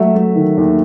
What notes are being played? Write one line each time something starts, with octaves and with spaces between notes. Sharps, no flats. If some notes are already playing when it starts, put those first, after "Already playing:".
Already playing: F#3 A3 E5
A3
D#3
D#2